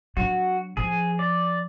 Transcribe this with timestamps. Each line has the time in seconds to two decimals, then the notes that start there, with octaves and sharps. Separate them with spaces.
0.17 F#3 D4 F#4
0.77 E3 F3 G#4
1.19 D5